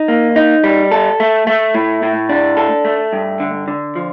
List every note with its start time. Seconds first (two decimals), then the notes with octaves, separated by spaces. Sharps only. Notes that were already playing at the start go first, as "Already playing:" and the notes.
Already playing: D#4
0.08 A#3
0.36 D#4
0.64 G3
0.92 A4
1.20 A3
1.47 A3
1.75 A2
2.03 A2
2.29 D4
2.57 A4
2.85 A3
3.13 G2
3.40 D3
3.68 D3
3.96 F3